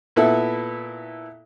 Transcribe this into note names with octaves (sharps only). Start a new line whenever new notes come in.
A#2 B3 E4 A4 E5